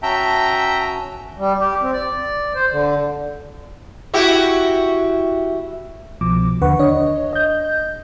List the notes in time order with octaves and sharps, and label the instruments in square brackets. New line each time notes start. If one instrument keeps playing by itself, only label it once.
[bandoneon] C#4 F#4 [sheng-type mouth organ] E5 G5 A#5 [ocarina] A5
[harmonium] G3
G4
C4
D5
C5
D3
[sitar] E4 F#4 G4
[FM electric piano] C2 B2 F3 D6
D#2 D3 B4 F#5 C#6
D4 C#5 D#5
D#5 G6